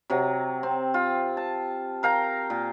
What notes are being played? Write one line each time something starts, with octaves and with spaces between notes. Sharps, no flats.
C3 F#3
C4
F4
A5
A#4 F5 G5 A#5
A#2